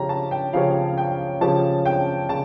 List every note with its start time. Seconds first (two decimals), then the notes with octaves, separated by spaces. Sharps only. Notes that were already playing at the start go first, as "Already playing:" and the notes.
Already playing: C#3 F3 C#4 G4 C#5 A#5
0.09 A5
0.31 G5
0.53 C#3 F3 C#4 G4 C#5 F5
0.98 G5
1.41 C#3 F3 C#4 G4 C#5 A5
1.86 G5
2.29 C#3 A5